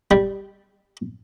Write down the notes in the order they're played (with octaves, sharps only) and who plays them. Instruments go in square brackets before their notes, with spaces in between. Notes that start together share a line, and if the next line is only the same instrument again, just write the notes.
[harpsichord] G3